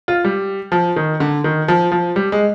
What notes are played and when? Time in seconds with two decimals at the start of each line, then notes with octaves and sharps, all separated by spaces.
0.08 F4
0.25 G3
0.72 F3
0.96 D#3
1.20 D3
1.44 D#3
1.68 F3
1.92 F3
2.16 G3
2.32 G#3